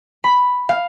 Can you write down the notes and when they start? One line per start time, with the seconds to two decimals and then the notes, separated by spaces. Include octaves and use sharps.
0.24 B5
0.69 F5